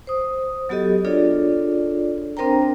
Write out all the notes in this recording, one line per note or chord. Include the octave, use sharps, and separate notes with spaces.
C5 D#6
F#3 B3 F#4 G4 A4 D#5
D4 F4 G#4 A4 C#5 D5
C4 D4 A#4 C5 G5 A#5